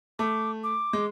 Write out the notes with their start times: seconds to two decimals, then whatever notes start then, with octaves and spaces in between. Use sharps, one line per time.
0.19 A3 D6
0.63 D6
0.93 G#3